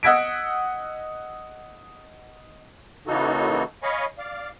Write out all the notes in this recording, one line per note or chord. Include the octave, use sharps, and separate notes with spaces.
D#5 F#5 E6 G#6 B6 D7
C#3 E3 A#3 D#4 F#4 A4
C#5 D#5 F5 G#5 B5 C#6
D5 F5